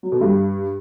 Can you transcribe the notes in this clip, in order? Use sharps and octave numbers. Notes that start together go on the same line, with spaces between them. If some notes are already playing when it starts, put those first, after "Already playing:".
F#3
B2
G2